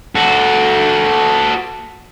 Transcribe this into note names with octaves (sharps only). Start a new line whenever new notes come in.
F#4 A4